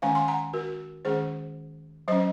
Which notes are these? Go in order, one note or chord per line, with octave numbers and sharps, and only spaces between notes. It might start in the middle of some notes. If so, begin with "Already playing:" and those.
D#3 G#3 C#4 F5 G#5
G#5 C6
F#5 A#5
F#4 A#4
D#3 G#3 C#4 G#4 C5
F#3 C#4 C5 D#5